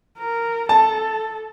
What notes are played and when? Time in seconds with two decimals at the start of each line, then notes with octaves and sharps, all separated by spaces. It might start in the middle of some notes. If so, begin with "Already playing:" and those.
0.18 A#4
0.69 A4 A5